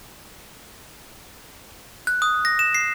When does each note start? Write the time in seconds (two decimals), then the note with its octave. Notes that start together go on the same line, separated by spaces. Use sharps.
2.07 F#6
2.22 D#6
2.45 A#6
2.59 E7
2.75 C7